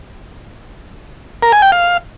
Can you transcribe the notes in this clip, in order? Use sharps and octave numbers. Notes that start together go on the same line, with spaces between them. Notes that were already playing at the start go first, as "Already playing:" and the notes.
A#4
G#5
G5
F5